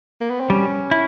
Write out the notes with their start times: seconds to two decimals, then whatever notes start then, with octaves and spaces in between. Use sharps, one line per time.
0.21 A#3
0.30 B3
0.40 C4
0.50 G3 C#4
0.91 E4